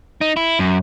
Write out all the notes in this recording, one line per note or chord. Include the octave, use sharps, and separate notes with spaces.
D#4
E4
F#2